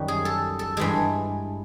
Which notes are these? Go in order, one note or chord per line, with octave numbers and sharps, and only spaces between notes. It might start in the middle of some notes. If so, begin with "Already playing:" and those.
Already playing: F#2 D#3 G3 F#4
G#4
A4
A4
G2 E3 G#3 G#4